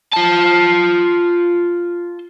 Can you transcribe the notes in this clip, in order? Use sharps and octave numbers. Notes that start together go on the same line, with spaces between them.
F4 A5